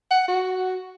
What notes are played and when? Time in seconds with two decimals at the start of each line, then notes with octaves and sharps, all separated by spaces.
0.11 F#5
0.28 F#4